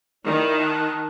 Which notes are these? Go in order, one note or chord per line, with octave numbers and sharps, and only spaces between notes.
D#3 E4 D5
A5 F#6